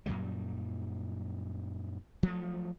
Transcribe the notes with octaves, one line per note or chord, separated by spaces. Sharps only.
F#2 A#2 F#3 G3
F3 F#3 A3